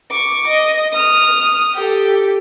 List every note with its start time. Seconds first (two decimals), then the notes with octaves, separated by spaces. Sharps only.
0.10 C#6 D6
0.47 D#5
0.92 D#6 F6
1.74 G4 A4